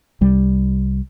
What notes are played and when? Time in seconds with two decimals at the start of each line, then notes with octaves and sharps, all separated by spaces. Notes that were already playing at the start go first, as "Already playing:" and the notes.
0.21 C2 G3